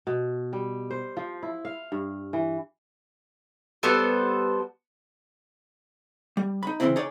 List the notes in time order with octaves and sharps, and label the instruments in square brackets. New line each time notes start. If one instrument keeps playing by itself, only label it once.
[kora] B2
G3
C5
F3
E4
F5
G2
E3
[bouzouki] G3 B3 A4 C5
[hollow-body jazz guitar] G3
D#4 B5
C#3 E3 A3 A#3 C4 E4
D#4 G#4 C#5 D5